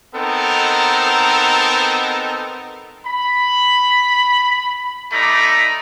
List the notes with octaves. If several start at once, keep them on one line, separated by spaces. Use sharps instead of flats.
B3 C4 D#4 A4 A#4
B5
G3 A3 D#4 D5 A#5 B5